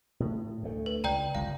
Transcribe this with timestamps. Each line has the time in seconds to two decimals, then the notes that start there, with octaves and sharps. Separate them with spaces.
0.20 A2
0.63 D2 A3
0.86 B4
1.04 C#2 D5 G5 A#5
1.35 G1 C#2 F5